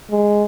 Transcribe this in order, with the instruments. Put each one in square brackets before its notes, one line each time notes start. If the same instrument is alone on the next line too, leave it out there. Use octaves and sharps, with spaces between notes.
[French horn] G#3